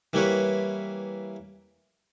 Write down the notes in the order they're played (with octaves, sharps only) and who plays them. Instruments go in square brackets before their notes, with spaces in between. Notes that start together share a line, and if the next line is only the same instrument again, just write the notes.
[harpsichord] E3 G3 A#3 E4 B4 C#5